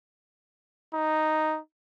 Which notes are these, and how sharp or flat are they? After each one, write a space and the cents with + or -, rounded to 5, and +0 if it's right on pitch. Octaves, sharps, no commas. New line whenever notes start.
D#4 +0